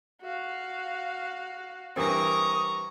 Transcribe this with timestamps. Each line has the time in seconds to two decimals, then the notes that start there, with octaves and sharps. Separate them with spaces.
0.21 F#4 F5
1.96 G2 E3 C4 A#4 A#5 C#6 D#6